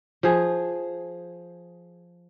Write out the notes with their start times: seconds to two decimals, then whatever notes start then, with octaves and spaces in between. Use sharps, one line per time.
0.23 F3 G#4